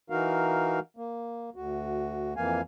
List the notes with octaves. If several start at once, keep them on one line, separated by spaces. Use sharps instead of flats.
E3 D#4 F#4 A#4 F5
A#3
D2 F#4
F2 E3 A#3 F5 G#5